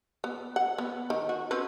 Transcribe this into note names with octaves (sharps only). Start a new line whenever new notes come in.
B3
F#5
B3
D#3
F#4
C4 C#4 B4